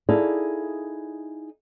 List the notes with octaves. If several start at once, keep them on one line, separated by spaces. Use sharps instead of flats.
D#4 E4 G#4 A4 D5 F5